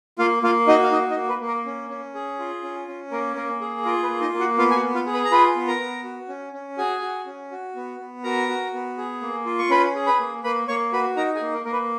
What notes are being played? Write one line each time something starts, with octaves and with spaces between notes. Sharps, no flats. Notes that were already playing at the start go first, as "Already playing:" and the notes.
A#3 F4 F5
A#3 F4 F5
D#4 F#4 D#5
F5
D#4 D#5
D#4 D#5
A#3
B4
A#3
A#4
C#4
C#4
G#4
F4
C#4
C#4
A#3 A#4
A#3 A#4
G#4
F4 A#4
B4
A#3
D#4 D#5
A#3
F#4 F#5
B3 F4 F5
G#5
F#4 F#5
B3
F4 F5
G#4
B4 B5
A#5
F4 B4 B5
B3
A#4 A#5
B3
F#4
C#4
C#4
F#4 G#4 G#5
F#4
C#4
F#4
B3
B3
F#4 A#4 A#5
F#4
B3
G#4
A#3
F4
C#6
C#4 B4 B5
G#4
B4 B5
A#3
A#3 B4 B5
A#3 C#5 C#6
F#4 B4 B5
D#4 A#4 A#5
G#4 G#5
A#3
A#4
A#3 A#4
B4